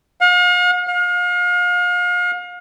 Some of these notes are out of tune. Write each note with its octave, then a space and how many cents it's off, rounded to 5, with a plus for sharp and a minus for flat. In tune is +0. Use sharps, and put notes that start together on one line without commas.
F5 +45
F5 +35